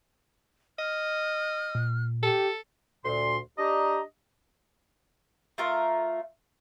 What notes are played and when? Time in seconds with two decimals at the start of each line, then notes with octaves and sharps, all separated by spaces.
0.79 D#5 F6
1.75 A#2
2.23 G4 A4
3.05 D2 A#2 C6
3.58 D4 G4 D#5 A#5
5.58 A3 F4 A#4